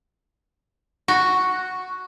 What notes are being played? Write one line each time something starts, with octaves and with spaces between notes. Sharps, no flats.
F#4